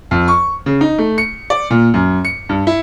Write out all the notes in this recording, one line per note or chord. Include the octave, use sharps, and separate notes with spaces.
F2
C#6
C#3
D#4
A3
C#7
D5
A#2
F#2
C#7
G2
E4